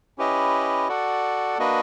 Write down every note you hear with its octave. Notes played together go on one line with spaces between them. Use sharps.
C#4 E4 G4 B4 D#5
F#4 A4 D5 F#5
A#3 D4 F#4 B4 D#5